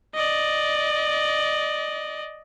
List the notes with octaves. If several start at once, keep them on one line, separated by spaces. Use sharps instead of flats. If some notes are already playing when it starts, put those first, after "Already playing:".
D5 D#5